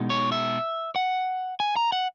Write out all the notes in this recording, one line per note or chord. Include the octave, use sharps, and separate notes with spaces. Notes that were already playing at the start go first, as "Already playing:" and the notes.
Already playing: B2 G#3 D#4
C#5
E5
F#5
G#5
A#5
F#5